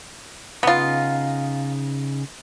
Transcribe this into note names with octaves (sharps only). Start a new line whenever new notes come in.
C#3 B3 D#4 F4 D#6